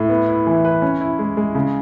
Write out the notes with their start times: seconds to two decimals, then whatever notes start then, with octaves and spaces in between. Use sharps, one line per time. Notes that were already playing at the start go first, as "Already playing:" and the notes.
Already playing: A2
0.09 B3
0.28 E4
0.47 E3
0.65 B4
0.82 C#4
1.01 E4
1.19 G#3
1.37 G#3
1.55 C#3